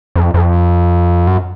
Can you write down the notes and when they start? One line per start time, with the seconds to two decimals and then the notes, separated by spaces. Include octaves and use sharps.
0.16 F2
0.34 F2
1.27 F#2